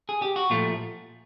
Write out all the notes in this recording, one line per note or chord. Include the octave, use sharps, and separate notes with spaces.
G#4
G4
F#4
A#2 F3 A3 F4